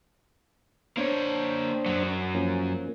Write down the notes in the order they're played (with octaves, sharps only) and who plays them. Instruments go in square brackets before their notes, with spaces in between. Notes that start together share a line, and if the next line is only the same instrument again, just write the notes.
[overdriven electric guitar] A#3 C#5 [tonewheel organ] D4 C5
[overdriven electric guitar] F#2 F#3
[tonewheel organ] F3 A#3 C#4